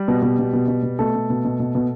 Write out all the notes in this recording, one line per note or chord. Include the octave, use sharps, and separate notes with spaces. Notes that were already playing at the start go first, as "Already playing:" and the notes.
Already playing: G3 G4
B2
B2
B2
B2
B2
B2
B2 A3 A4
B2
B2
B2
B2
B2